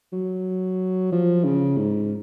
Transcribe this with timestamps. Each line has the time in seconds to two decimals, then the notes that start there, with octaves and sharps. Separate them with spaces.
0.12 F#3
1.12 F3
1.44 C#3
1.78 G#2